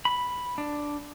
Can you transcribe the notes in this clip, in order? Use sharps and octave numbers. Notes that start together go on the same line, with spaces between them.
B5
D4